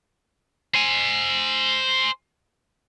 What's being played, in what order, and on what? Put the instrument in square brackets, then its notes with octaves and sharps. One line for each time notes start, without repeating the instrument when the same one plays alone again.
[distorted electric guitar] C5 G#5